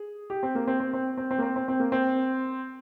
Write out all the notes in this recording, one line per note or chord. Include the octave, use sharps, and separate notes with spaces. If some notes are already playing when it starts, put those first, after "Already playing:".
Already playing: G#4
G4
C4
A#3
C4
C4
C4
C4
C4
A#3
C4
C4
C4
A#3
C4